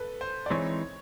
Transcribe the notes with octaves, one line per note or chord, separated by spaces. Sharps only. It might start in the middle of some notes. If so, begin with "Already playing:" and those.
Already playing: A4 B4
C5
D5
E3 G#3 C4 D#4 C#5